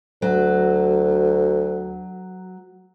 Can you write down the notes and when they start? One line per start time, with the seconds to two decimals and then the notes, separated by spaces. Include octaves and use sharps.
0.22 D2 F#3